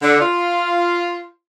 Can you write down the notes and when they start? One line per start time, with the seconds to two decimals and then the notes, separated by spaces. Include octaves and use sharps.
0.02 D3
0.21 F4